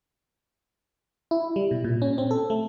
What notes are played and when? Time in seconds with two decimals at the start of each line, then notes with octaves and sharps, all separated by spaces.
1.31 E4
1.56 G3
1.71 B2
1.84 A#2
2.02 C#4
2.18 C4
2.31 A4
2.50 A3